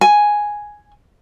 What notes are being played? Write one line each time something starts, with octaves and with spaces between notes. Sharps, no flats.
G#5